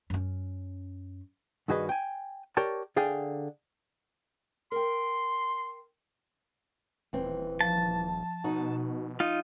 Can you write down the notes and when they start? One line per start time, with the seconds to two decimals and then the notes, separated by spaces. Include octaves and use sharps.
0.10 F#2 C#4
1.68 G2 D#3 F#4 G#4 B4 D#5
1.89 G5 G#5
2.57 G4 A#4 C#5 D5 A5
2.96 D3 G#4 D5 F5 G5
4.72 A#4 G5 C6
7.13 D#1 E3 C4
7.61 F3 A5
8.44 B2 D#4 F#4
9.20 D#4 F4